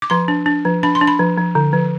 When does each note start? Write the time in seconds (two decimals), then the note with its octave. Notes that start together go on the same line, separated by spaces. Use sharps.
0.02 D6
0.10 F3 C6
0.28 D4
0.46 D4
0.65 F3
0.83 D4 B5
0.95 C6
1.01 D4
1.08 B5
1.19 F3
1.38 F3
1.55 D3
1.73 F3